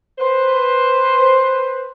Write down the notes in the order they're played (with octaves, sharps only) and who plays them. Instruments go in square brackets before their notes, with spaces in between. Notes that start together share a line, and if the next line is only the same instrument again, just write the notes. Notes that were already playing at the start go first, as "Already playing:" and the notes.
[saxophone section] B4 C5